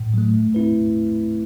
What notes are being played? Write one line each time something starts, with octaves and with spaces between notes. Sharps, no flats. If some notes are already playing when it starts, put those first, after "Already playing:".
Already playing: A2
F#3 A3
A3
C4 E4 B4